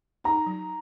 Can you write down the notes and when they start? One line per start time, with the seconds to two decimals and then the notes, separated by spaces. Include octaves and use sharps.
0.24 D#4 A#5
0.46 F#3